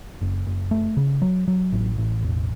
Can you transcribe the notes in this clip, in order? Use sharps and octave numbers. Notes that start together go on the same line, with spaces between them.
F#1
F#1
A3
C#3
F#3
F#3
A1
A1
E1